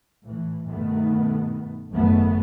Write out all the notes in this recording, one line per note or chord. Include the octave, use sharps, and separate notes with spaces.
A2 E3
G2 B2 D#3 A3 B3
G#1 F#2 C#3 A3 B3